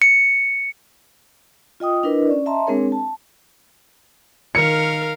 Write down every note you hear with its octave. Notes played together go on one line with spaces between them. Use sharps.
C#7
F4 D#5 G5 D#6
D4 E4 A#4 B4 D#5
C#4 D5
D#5 E5 A5 A#5 C6
G#3 C4 D4 G#4 A#4 C#5
A5
D#3 A#4 F5 C#7